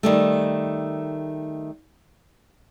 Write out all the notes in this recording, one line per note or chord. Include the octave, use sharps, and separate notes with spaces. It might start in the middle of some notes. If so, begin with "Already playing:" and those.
D#3 G3 A3